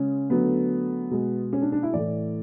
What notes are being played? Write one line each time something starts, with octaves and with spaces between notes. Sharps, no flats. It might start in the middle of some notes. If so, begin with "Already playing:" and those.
Already playing: C#3 G#3 C#4
D3 F#3 A3 B3
B2 G#3
C#4
D4
D4
E4
A2 E3 A3 D5